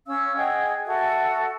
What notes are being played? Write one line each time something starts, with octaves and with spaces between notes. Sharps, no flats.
C#4 F5 E6
G#4 D#5 F#5 G5
F#4 A4 E5